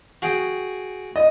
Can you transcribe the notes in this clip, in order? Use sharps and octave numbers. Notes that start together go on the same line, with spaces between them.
F#4 G#4 G5
D#5